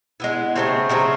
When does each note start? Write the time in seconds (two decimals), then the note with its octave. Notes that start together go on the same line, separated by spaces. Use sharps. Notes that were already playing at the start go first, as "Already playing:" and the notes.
0.20 G#3 B3 E4
0.56 C#3 F#3 A3 C4
0.89 C#3 F#3 A3 C4